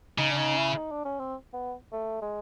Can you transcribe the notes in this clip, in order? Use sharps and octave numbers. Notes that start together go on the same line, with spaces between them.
C#3 D#4
D4
D#4
E4
D#4
D4
C#4
C4
B3
A3
G#3